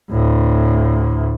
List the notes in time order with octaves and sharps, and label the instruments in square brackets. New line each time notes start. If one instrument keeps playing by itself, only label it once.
[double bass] D2 A2